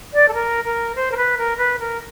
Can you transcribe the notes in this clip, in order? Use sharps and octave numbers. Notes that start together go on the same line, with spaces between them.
D5
A4
A#4
A#4
C5
A#4
B4
A#4
B4
A#4